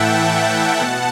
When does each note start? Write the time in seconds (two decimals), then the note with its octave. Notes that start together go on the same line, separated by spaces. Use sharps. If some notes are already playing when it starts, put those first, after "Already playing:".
Already playing: A2 E3 E5 F#5 G5 A5
0.81 B2